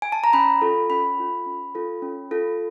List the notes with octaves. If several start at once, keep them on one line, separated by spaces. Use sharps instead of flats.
G#5
A5
A#5
C#4 B5
F4 A4
C#4 B5
F4 A4
C#4
F4 A4
C#4
F4 A4